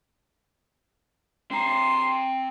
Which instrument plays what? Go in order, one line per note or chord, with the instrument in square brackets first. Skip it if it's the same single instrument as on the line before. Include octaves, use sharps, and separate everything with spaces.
[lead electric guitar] C4 A#5 [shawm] C6